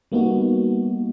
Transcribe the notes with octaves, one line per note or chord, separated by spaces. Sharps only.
G3 A#3 B3 D#4 F#4